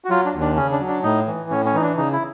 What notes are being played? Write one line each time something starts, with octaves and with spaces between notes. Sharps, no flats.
F#4
F#3 F4
D4
D#2
D4
C#3 C#4
D4
F#3
D4
A2 D#4
E3
A2 C#4
C#4
E3 D#4
D4
C#3 D#4
E4